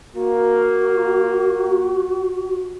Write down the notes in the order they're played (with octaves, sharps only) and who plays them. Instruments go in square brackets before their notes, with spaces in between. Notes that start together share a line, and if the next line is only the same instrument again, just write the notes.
[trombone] A#3 [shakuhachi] F#4